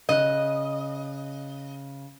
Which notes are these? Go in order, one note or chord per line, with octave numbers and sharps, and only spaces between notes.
C#3 D#5 F#6